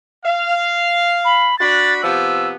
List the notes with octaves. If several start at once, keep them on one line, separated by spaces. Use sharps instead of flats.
F5
B5
D4 F#4 B5 A6
C3 F3 B3 E6